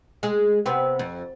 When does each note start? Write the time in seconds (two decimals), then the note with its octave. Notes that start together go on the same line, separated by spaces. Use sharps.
0.23 G#3 G#4
0.66 C3 B3 C4
0.99 F2